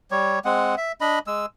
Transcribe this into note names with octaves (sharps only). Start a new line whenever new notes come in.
G3 C#5
G#3 C4 F#5
E5
D4 D#5 B5
G#3 E6